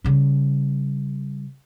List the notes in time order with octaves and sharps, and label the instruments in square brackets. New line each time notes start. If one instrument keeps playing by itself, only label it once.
[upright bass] C#3 G3